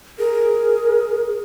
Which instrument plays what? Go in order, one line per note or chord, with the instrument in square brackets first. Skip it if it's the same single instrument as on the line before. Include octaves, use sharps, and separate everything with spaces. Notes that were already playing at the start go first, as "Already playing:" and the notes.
[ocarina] G#4 [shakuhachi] A#4